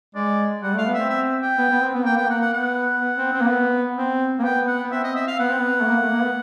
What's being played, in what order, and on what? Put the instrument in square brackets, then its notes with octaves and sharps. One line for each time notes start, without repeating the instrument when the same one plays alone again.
[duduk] G#3 [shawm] D5
[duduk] G3 [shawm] F#5
[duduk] A3
[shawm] F5
[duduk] B3
[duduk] C4 [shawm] E5
[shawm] E5
G5
[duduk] B3
B3
C4
B3
[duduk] A#3 [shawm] G5
[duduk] B3 [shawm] G5
[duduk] A#3 [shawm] F#5
[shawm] F#5
[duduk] B3 [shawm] F#5
[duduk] B3
C4
C4
A#3
B3
C4
A#3
[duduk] B3 [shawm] G5
[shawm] F#5
[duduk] B3
[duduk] C4 [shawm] E5
[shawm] D#5
E5
F5
[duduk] B3 [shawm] F#5
[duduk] C4
B3
A3
A#3
A3
A#3
B3